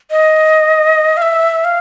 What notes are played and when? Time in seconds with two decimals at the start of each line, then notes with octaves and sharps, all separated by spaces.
0.11 D#5
1.17 F5
1.22 E5
1.65 F5